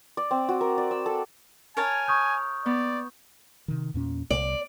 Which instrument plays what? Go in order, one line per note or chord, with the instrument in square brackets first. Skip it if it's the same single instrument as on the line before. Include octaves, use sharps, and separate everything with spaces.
[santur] D5
C4
F#4
A#4
D5
E6
A4
[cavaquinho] A#4 C#5 A5 [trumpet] G#5
[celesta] C#6 D#6 G6
[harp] B3 [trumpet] D5
[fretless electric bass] C3 D#3
E2 A#2 C#4
[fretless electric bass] C2 [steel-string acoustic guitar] D5